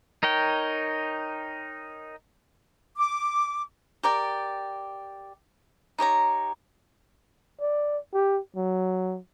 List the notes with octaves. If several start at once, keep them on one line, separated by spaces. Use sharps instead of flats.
D#4 A#4 C#5 G5
D6
G4 A#4 D5 G5
D#4 G4 C#5 A#5
D5
G4
F#3